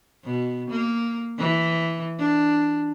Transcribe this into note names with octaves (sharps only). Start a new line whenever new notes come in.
B2
A#3
E3
D4